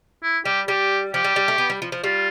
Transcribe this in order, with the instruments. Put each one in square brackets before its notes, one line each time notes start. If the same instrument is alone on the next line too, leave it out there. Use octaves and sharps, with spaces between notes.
[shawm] E4
[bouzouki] G3 [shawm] G4
[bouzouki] G3 [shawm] G4
[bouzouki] F3 [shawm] G4
[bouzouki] G3
G3
A3
B3
G3
F3
F3
[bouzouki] G3 [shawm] F4